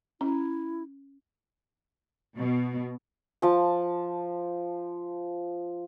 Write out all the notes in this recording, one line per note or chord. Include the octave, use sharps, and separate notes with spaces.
C#4 E4
B2
F3 A5